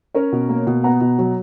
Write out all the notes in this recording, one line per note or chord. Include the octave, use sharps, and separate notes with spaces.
C#4 A#4 C#5
B2
A#3
B2
B3 F#5 A#5
B2
F#3